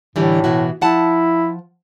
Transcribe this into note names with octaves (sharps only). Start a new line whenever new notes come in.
A2 D3 E3 G3
B2 E3 F#4
F3 E4 F#5 A5